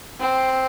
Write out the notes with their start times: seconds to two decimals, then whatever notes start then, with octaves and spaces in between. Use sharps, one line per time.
0.21 C4